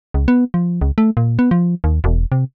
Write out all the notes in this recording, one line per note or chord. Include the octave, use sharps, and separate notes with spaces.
C#2
B3
F3
C#2
A3
A#2
B3
F3
D#2
E1
C3